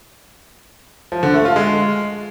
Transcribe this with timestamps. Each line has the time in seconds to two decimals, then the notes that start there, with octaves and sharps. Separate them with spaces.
1.12 F3
1.23 D3
1.34 A3
1.45 F4
1.56 G#3